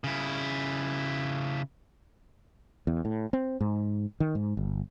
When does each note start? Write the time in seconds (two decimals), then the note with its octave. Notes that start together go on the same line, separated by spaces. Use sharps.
0.04 C#3 E4
2.87 E2
3.05 A2
3.33 C4
3.61 G#2
4.20 D#3
4.35 G#2
4.57 G1